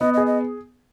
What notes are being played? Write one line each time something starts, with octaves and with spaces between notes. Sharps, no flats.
B3 D#5
G#4 D#5
D#5